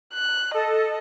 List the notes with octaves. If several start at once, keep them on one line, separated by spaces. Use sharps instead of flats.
F#6
A4 D#5